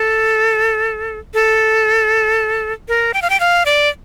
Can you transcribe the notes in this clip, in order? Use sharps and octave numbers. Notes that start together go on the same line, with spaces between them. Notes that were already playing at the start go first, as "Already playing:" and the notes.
Already playing: A4
A4
A#4
G5
F5
G5
F5
D5